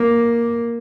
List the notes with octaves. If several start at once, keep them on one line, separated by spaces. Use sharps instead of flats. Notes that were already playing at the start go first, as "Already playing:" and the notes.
Already playing: A#3